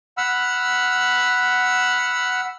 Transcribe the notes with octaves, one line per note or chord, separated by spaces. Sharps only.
F#5 B5 E6 F6